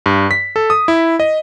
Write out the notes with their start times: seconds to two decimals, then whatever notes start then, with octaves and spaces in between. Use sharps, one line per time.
0.06 G2
0.31 B6
0.56 A4
0.70 D#6
0.88 E4
1.20 D#5